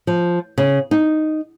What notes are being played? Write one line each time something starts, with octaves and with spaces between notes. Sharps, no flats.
F3
C#3
D#4